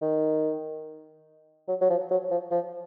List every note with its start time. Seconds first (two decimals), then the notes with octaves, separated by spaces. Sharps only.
0.02 D#3
1.68 F#3
1.81 F#3
1.90 F3
2.11 F#3
2.31 F3
2.51 F3